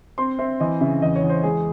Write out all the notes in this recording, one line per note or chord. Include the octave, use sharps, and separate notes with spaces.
C4 C6
C4 E5
E3 D#5
C#3 E5
E2 D#5
C#5
E2
C5
G#3 G#4